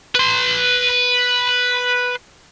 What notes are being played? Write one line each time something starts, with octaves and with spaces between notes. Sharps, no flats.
B4 C6